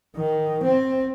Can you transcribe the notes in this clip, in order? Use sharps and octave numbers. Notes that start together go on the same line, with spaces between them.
D#3
C4